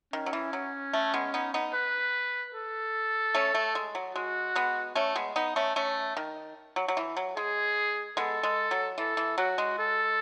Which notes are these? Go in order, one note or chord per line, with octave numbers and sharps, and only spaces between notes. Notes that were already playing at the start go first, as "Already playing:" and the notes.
D#3 C#4
F#3
E3
F#3
A3
G#3 B3
B3 D#4
B3 D#4
B4
A4
A3 C#4
A3
G#3
F#3
G#3 F#4
G#3 B3
A3 C#4
G#3 B3
B3 D#4
A3 C#4
A3 C#4
D#3
F#3
F#3
E3
F#3
G#3 G#4
G#3 B3 A4
G#3
F#3
E3 A4
E3
F#3 F#4
G#3
A4